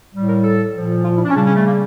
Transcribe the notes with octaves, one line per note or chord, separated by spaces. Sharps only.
A2 G3
A#4
A4
A#2 F3
F4
E4
D4
C#4
C#3 G3 D4
C#4
A3
A#3